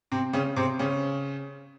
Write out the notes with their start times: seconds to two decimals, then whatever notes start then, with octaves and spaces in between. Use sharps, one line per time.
0.12 C3 C4
0.33 C#3 C#4
0.56 C3 C4
0.79 C#3 C#4